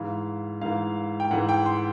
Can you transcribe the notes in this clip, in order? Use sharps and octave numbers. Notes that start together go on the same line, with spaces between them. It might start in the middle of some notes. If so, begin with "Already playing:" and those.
Already playing: G#2 E3 F5
G#2 E3 F5
G5
G#2 E3 F#5
G5
C6